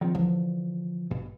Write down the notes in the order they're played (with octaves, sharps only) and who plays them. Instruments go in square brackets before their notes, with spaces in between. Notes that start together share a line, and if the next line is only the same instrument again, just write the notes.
[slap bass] D#3 C4 [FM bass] F3
[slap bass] D3 [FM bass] E3 [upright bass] F3
[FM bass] G#1 [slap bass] G2 B2